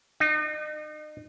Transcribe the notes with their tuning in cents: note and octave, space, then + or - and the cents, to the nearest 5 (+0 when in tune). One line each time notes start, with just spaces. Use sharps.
D#4 -35